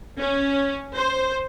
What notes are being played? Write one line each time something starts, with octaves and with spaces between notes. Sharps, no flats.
C#4
C5